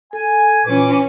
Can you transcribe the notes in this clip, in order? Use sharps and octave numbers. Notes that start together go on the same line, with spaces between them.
A4 G#5
A#2 E3 C#4 B4 D6